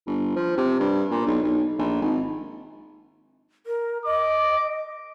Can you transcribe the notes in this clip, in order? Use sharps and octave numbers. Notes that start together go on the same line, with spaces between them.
G1
F3
C3
G2
A#2
B1
B1
A#1
G#1
A#4
D#5 D6